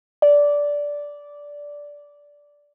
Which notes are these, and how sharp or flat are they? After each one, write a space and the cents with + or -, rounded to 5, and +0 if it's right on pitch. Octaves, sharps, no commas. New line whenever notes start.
D5 -10